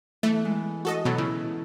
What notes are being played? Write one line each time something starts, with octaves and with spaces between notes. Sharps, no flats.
E3 A3 B3
G#3
F#4 A4 D#5
B2 F#3 B3 A4
C#3 E4